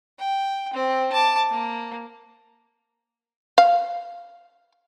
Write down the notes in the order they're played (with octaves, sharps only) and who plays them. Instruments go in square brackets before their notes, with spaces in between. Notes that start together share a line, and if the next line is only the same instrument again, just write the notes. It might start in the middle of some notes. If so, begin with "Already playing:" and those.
[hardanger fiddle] G5
C4
A5 D6
A#3
[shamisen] F5